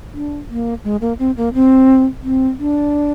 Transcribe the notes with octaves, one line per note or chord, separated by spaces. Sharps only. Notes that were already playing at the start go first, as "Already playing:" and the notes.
D4
A#3
G#3
A#3
C4
A#3
C4
C4
D4